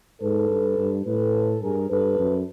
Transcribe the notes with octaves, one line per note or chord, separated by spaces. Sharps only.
G#2 A4 B4
G2
G2
A2 A4 B4
G2 G#4 A#4
G2 A4 B4
F#2